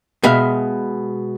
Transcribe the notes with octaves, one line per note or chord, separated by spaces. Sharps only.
B2 G#3 E5 F5